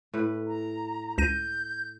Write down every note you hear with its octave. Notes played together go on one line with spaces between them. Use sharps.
A2 B4
A#5
C#2 G6 A#6 D#7